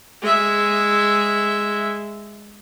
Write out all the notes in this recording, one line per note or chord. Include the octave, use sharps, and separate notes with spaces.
G#3 E5